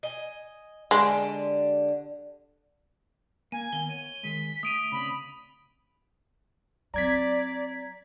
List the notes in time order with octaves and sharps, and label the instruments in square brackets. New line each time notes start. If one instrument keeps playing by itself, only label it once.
[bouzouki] D#5 G#5
[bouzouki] D3 G4 [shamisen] G#3
[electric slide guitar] A#3 [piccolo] G#5 [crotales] D#7
[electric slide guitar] D#3 A#3 B3 [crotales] G7
[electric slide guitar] C#5 [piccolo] D#7
[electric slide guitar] D#3 G#3 [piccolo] B6
[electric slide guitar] A3 [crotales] D#6 D7 D#7
[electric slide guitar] C#3 C4 D5 [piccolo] B5
[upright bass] F#3 C4 [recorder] D5 [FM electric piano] A#5 G#6 B6